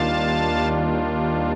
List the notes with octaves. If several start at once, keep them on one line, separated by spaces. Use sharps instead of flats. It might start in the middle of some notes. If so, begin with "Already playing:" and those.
Already playing: D#2 D#3 G3 D4 F4 F5 A5